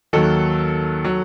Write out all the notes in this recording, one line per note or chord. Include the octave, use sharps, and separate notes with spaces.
D#2 D#3 F#3 A4
F#3